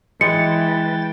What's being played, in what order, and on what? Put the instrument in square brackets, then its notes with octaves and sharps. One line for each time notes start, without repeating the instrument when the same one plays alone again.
[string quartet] E3 [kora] G#3 [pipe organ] G5 A6 [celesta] C#7